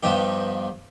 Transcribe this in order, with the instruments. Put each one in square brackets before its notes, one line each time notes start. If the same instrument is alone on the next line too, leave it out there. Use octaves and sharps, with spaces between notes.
[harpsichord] G2 F3 G3 B3 D#4 G4